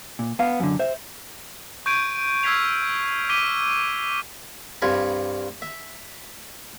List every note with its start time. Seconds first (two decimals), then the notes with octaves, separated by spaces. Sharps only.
0.19 A#2
0.39 B3 F5
0.60 F#2 D3
0.79 C5 E5
1.86 C#6 G6 G#6 D7 D#7
2.43 E6 F6 G#6 B6 C7 F7
3.29 D6 B6 D#7 G7
4.82 C2 G2 C3 F4 G#5 B5
5.62 E5